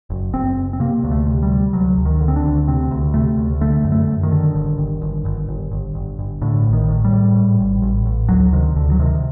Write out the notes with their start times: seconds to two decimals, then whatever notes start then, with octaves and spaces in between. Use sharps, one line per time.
0.10 F#1
0.33 F#1 C4
0.57 F#1
0.73 C4
0.80 C3 A#3
1.04 D2
1.11 A3
1.27 C3
1.43 G3
1.51 C3
1.73 D2 F#3
1.97 D2
2.05 D#3
2.20 D3
2.28 C4
2.36 D4
2.44 D2
2.67 C3 C4
2.91 D2
3.14 C3 A3
3.38 D2
3.61 D3 A3
3.85 F#2
3.92 A3
4.08 F#2
4.23 D#3
4.31 D3
4.54 G1
4.78 G1
5.02 G1
5.25 G1
5.49 G1
5.71 G1
5.95 G1
6.19 G1
6.42 A2 D3
6.66 A1
6.73 D#3
6.89 A2
7.04 G3
7.12 A2
7.36 A2
7.59 A1
7.82 A1
8.06 A1
8.29 D2 F#3
8.53 C3 D#3
8.76 D2 D3
8.92 F#3
8.99 C3 D#3